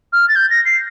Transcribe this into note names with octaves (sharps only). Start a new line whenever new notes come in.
F6
A6
G6
A#6
C7